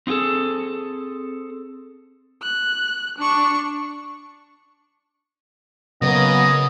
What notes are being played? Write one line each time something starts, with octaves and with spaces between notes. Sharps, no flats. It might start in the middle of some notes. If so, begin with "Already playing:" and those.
C4 D#4 F4 G#4 A4
F#6
D4 C#6
C#3 F#3 A#3 B3 D#5